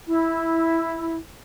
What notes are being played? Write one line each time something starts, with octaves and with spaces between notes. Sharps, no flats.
E4